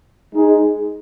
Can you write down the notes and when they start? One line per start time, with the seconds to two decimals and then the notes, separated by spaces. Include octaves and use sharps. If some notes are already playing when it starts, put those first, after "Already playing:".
0.34 G#3 D#4 G#4